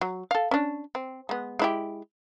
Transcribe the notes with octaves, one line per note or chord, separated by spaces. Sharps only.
F#3
A4 F5
C#4 D4
C4
G#3 B3
G#3 E4 G4